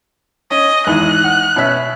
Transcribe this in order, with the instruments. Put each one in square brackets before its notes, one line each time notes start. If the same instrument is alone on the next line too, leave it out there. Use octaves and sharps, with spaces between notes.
[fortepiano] C#4 [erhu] D#5
[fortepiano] G#1 E2 G#2 [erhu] F#6
[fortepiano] F#5
B2 C#4 E5